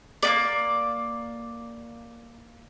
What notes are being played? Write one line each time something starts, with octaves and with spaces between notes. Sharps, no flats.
A#3 B3 D5